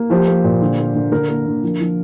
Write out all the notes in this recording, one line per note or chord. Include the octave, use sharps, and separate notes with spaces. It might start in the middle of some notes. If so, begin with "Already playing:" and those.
Already playing: A#3
F3 G4 C5
A#3
A#2
D3
A#3
D3
D3 A#4
A#3
D3
F3
F3